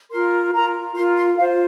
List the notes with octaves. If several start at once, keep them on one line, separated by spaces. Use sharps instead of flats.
F4 A#4 C6
F4 A#4 A#5
F4 A#4 C6
C6
F4 C5 F5